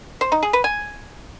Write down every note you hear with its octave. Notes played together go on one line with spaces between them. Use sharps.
C5
D#4
G#4
B4
G#5